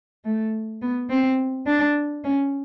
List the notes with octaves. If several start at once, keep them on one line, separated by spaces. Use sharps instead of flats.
A3
B3
C4
D4
C#4